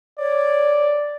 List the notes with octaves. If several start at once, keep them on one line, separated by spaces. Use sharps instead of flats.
C#5 D5